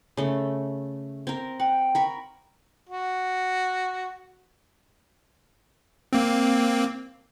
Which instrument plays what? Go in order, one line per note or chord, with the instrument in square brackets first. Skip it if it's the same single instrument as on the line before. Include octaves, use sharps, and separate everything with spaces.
[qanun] C#3 A3
C4 A#4
[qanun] F#5 [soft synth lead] G5
[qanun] A#4 B5 C#6
[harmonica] F#4
[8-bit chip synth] A#3 C4